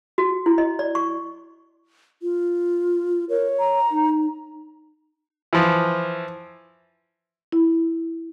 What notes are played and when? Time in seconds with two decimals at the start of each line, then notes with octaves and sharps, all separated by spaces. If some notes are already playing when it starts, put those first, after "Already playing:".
0.18 F#4
0.46 E4
0.58 D#5
0.79 D5
0.95 C#6
2.22 F4
3.30 A#4 C#5
3.59 A#5
3.91 D#4
5.53 E3 F3
7.52 E4